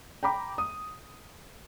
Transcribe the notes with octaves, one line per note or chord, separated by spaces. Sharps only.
G5 A#5 B5 D6
D#6